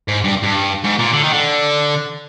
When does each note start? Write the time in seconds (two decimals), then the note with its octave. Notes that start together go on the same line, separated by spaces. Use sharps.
0.08 G#2
0.24 G2
0.43 G2
0.84 G#2
0.99 A#2
1.13 D3
1.24 D#3
1.33 D3